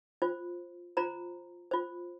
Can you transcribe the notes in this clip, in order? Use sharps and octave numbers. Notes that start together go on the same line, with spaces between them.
F4 C5
F4 C5 A#5
F4 C5